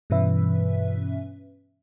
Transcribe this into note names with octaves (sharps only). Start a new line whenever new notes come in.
G2 B2 E3 C#4 B4 E5